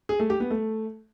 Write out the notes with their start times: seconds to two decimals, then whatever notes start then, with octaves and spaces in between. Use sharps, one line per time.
0.09 G#4
0.20 A3
0.30 G4
0.40 B3
0.51 A3